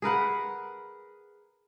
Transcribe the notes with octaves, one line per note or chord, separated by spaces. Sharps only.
G#4 A#4 B4 F#5